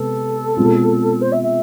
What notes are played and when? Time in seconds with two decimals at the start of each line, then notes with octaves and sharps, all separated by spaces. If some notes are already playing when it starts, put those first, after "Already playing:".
Already playing: C3 G#3 B3 A4
0.57 B2 G#3 C4 F4
1.21 C5
1.32 E5
1.43 E5